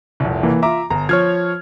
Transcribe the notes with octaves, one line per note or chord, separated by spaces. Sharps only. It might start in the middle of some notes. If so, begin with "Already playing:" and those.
F1 C2
E3 A#3
F4 E5 A#5 D6
G1 A#5
F3 C#5 F6 G#6